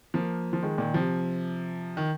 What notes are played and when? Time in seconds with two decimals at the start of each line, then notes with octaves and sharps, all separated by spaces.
0.14 F3 A#3
0.53 F3
0.63 D#3 G#3
0.78 A#2 D#3
0.94 C3 F3
1.97 D#3